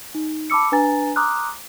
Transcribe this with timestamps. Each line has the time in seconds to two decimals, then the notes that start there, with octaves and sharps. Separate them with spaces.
0.15 D#4
0.50 A5 B5 D6 E6 C#7
0.72 D4 B4 G#5 A#5 A6
1.16 A#5 C6 D6 D#6 F6 F#6